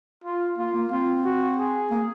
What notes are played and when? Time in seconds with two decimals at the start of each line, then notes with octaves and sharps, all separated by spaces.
0.24 F4
0.57 A#3 F4
0.74 A#3
0.91 C4 F4
1.24 F#4
1.58 G#4
1.90 A#3